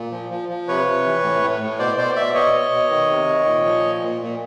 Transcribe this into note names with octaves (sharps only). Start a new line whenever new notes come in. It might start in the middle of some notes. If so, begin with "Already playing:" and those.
Already playing: A#2
F3
F3
F3
C3 B4 C#5
C3
E3
A2
A2
A2
B2 C5 D5
B2 C5 D5
B2 D5 E5
B2 C#5 D#5
B2
B2
D#3
C3
D#3
A#2
F3
A#2
A#2
A#2